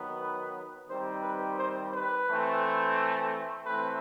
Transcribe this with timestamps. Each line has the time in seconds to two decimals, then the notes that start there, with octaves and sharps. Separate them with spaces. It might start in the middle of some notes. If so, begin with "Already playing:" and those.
Already playing: D#3 F#3 B3
0.19 B4
0.88 D#3 G3 C4 C5
1.23 B4
1.57 C5
1.93 B4
2.27 E3 A3 C4
3.66 E3 A3 C4 B4